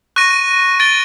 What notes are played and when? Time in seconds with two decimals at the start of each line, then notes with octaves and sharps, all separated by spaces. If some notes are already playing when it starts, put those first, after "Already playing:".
0.16 C#6 F#6 A#6 D#7
0.79 A6 D7 G7